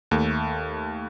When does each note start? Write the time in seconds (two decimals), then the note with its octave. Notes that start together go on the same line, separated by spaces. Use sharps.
0.11 D#2 A3